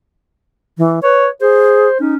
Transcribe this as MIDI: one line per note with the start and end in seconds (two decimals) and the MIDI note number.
0.78 1.00 52
1.03 1.29 71
1.03 1.27 73
1.41 1.88 68
1.41 1.96 72
2.00 2.18 61
2.00 2.15 63